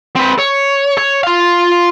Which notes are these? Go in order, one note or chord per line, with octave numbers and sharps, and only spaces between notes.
C4 B4
C#5
C#5
F4 F5